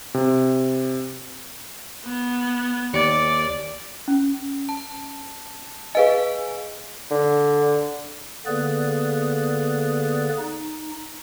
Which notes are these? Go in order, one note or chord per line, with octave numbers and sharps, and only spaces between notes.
C3
B3
D#2 D5 C#7
C#4
A5
G#4 B4 D#5 F5 G#5
D3
D3 A#3 B3 G#4 B4 D5
D#4